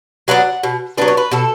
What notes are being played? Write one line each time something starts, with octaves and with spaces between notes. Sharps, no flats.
F#3 B3 D4 F#5
B2
F#3 B3 D4 B4
C#5
B4
B2 A4